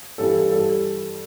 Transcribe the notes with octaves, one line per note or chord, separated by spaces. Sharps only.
G2 E3 G3 A4
G3 A4